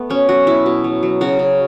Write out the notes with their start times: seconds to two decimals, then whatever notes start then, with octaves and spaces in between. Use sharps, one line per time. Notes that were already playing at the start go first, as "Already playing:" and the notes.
Already playing: A3 B3
0.10 B2 C#4
0.28 F#3 F#4
0.47 B2 E4
0.66 B2
0.84 F#3
1.03 F#3
1.21 C#3 F#4
1.39 C#3